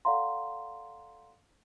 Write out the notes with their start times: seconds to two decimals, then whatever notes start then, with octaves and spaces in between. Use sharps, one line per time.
0.05 A4 D5 F5 F#5 A#5 C6